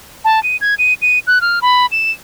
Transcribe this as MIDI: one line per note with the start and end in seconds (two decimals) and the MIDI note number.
0.25 0.42 81
0.43 0.57 99
0.61 0.75 92
0.79 0.94 99
1.02 1.19 99
1.27 1.41 90
1.41 1.59 89
1.62 1.86 83
1.92 2.11 100